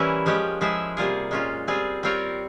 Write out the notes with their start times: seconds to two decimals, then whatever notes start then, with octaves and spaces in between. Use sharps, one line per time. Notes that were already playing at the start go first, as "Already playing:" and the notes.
Already playing: E3 G3 A#3 C#4 E4
0.26 F3 G#3 C#4 G4
0.61 F3 G#3 E4 G#4 E5
0.97 C3 G3 A#3 F4 G#4
1.31 A#2 G#3 C#4 F4
1.68 G3 C4 F4 G#4
2.03 G3 C4 F4 A#4 C#5